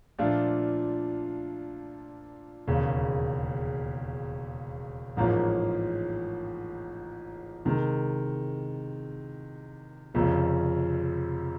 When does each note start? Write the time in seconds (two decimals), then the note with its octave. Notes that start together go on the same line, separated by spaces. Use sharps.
0.18 A#2 F3 A3 D4 F4
2.67 E1 D#2 C#3
5.17 A1 G#2 F3 A#3 C#4
7.65 C3 D#3 G#3
10.14 F1 F2 C#3 F3